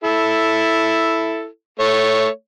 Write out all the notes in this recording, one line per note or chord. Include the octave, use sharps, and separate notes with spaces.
E4 A4
A3 C#5